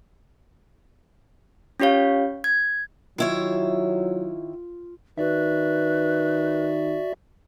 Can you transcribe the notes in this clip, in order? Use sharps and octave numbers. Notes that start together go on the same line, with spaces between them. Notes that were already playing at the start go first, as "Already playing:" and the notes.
C#4 F4 G4 C#5 F5
G#6
D#3 F#3 E4 F4 C#5
D#3 F#4 B4 D5 E5